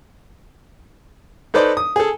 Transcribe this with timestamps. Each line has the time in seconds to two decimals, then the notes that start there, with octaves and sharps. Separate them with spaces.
1.54 D#4 A4 B4 C5 D5
1.77 D#6
1.96 G#4 A4